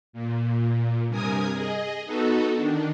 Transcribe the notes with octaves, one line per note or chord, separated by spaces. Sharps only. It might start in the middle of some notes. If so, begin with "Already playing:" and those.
A#2
G2 C3 A#4 G#5 D#6
G#4 D#5
B3 D#4 F#4 A4
D#3 D4